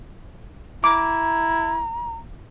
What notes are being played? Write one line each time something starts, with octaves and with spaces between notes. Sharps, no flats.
E4 A#5 D6